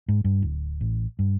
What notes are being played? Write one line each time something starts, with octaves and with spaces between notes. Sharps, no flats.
G#2
G2
D1
A1
G2